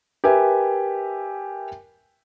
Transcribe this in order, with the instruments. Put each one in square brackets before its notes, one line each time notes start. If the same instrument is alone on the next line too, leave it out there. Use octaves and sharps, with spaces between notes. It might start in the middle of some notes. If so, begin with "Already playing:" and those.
[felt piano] G4 A#4 B4 E5 G#5